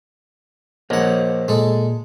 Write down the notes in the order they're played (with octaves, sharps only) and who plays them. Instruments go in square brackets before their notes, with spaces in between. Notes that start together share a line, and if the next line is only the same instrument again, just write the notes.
[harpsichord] A#1 F#5 [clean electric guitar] A#4 C#5 D#5
[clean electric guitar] A#2 [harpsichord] G#3 A4